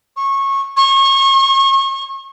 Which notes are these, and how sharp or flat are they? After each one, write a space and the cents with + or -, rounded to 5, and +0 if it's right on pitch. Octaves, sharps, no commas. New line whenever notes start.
C#6 -20
C#6 -35